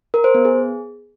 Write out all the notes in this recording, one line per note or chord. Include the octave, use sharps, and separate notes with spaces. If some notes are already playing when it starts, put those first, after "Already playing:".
A#4
C5
B3
G#4